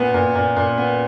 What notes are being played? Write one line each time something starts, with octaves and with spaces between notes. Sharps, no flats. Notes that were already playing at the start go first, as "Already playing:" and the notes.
Already playing: A#2 B3
A#2
A#2
A#2
B3